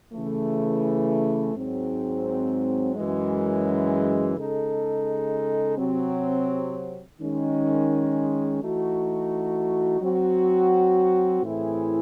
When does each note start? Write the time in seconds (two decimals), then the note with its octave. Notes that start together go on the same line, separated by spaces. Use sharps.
0.13 C#3 E3 A3
1.54 G#2 F#3 C4
2.96 F#2 E3 G#3
4.37 C#3 G#3 D#4 A4
5.78 C3 F#3 C4
7.19 D#3 G#3 C#4
8.60 E3 A3 D#4 F#4
10.01 F#3 C4 F#4
11.42 A2 E3 C4 E4 G#4